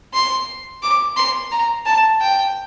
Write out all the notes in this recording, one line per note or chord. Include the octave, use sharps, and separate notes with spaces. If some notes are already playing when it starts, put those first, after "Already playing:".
C6
D6
C6
A#5
A5
G5